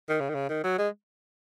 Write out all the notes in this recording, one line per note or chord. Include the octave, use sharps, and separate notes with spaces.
D#3
C#3
D#3
C#3
D#3
F#3
G#3